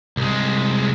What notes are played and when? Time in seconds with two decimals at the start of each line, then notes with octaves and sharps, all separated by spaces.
0.17 C2 G#3